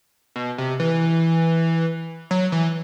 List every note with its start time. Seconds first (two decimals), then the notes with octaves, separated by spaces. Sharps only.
0.36 B2
0.58 C3
0.80 E3
2.31 F#3
2.52 E3